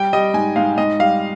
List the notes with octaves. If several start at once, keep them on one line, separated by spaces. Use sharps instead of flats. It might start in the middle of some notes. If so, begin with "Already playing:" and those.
Already playing: G3 G5
G3 D#5
G#2 G#5
G#2 F5
G#2 D#5
G3 F5